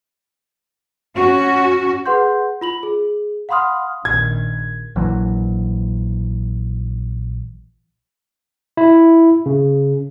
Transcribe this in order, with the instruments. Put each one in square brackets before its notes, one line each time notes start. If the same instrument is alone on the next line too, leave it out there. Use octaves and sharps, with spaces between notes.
[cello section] C#4 F#4
[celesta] G#4 B4 F#5 C6 G6
F4 B5 F#7
G#4
F5 F#5 B5 C6 D#6 F6
[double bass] A#1 D#3 [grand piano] G#6
[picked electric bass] A#1 E3 F#3
[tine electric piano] E4
C#3